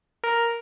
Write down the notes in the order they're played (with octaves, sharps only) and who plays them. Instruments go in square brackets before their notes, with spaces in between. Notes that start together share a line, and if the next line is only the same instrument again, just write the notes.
[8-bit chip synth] A#4